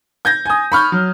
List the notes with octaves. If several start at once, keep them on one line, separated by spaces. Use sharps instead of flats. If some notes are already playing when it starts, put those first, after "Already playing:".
G6 G#6 A#6
G#5 D#6
B5 C#6 F6 G6
F#3